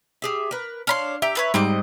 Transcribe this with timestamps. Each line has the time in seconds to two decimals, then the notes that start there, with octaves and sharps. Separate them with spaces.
0.22 G4 G#4 E5
0.51 A#4 B4
0.87 D4 C#5 F5 B5 C6
1.22 G4 E5 A#5
1.35 A4 B4 C#5
1.54 G#2 G3 C4 D#5 D6